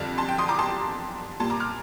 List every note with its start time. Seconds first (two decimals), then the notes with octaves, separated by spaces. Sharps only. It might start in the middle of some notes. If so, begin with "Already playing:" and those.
Already playing: F2 D3 G3 F5 A5
0.18 A5 C6
0.29 G5
0.38 C6 D#6
0.48 A#5 D6
0.59 A5 C6
1.40 A#2 G3 A5 C6
1.50 A#5 D6
1.60 D6 F6